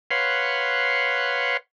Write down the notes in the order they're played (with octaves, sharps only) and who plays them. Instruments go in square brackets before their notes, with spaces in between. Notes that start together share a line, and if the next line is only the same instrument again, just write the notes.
[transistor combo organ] B4 C#5 F5 F#5 C6